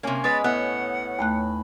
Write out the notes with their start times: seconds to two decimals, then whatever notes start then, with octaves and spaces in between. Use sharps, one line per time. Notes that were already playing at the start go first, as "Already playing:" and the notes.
0.03 C3 A#3 C#4 C#5 G#5
0.24 G#3 B3 B4 D#5 A6
0.44 A2 B3 F#5 F#6
1.19 D#2 A3 B4 F#6